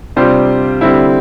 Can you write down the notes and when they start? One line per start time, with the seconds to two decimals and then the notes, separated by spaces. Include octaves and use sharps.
0.16 C3 G3 D4 F4 C5
0.81 D3 G3 C4 E4